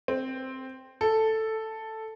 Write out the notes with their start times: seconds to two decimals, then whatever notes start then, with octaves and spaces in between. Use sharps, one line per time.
0.08 C4
1.01 A4